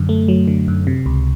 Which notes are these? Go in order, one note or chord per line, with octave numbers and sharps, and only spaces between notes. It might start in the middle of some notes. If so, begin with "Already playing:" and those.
Already playing: F#2 D3
A3
F#3
D3
F#2
C3
C#2